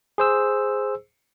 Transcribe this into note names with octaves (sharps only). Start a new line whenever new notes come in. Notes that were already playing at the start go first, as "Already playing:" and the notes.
G#4 C5 E6